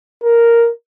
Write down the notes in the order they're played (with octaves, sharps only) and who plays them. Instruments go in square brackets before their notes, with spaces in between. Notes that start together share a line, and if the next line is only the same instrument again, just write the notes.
[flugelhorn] A#4